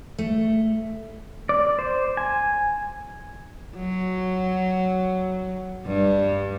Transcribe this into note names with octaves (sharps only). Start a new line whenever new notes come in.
A3
D5
C5
G#5
F#3
G2 G3